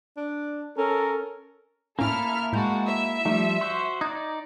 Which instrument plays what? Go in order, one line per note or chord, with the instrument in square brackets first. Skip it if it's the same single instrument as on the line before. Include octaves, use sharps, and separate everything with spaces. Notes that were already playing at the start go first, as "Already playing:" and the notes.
[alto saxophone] D4
[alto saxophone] C#4 [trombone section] A4 [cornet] A#4
[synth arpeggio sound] A2 C#4 [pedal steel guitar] A#3 E4 [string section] A4 E5 F6
[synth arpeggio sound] A2 G6 [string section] G#3 F#4 A5
[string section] E5
[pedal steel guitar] F3 G3 [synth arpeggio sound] A3 D#4 A5
[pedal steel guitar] F#4 C5 [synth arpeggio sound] C6 E6
[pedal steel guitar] D#4 D5 [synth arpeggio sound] D#6 F#6 G#6